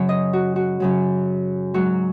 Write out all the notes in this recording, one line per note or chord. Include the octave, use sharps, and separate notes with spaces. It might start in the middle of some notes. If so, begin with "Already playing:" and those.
Already playing: F#2 C#3 F#3 C#5
D#5
F#4
F#4
F#2 C#3 F#3
G#2 F#3 F#4